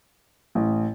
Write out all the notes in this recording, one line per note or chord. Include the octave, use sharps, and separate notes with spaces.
A1